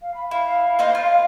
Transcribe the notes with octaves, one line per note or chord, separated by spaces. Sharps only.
F5
B5
E4 F5
A#3 D#4 C5
F4